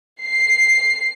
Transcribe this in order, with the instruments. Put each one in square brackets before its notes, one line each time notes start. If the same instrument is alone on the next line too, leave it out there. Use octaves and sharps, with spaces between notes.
[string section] C7